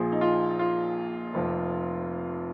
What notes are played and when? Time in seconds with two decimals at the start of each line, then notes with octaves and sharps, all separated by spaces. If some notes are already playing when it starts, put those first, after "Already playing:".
Already playing: A#1 A#2 F3 G#4
0.12 D#4
0.21 F4
0.59 F4
1.34 F1 F2 F3